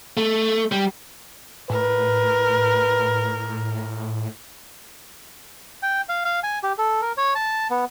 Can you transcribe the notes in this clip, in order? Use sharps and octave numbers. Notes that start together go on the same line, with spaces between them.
A3
G3
A2 A#4 B4
G5
F5
F5
G#5
G4
A4
A#4
C#5
A5
B3